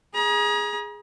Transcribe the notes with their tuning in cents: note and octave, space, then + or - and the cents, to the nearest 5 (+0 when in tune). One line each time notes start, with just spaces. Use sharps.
G#4 +0 A#5 +40